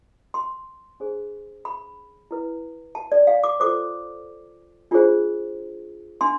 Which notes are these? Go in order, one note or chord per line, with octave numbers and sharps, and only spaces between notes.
C6
D4 G#4 C5
B5
E4 B4
A5
D5
F5
D6
F4 A4 C5 D6
D4 F4 G#4 C5
D4 C6